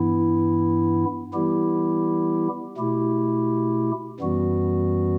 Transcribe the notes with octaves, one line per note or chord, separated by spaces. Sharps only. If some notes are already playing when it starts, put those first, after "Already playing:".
Already playing: G2 E3 B3 E4
E3 G3 B3 E4 G4
B2 A3 E4 G4
F#2 E3 G3 B3 F#4